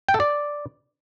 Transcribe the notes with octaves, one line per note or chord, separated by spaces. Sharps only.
G5
A4
D5